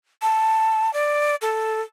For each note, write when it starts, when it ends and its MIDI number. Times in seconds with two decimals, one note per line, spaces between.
0.22 0.92 81
0.93 1.35 74
1.42 1.81 69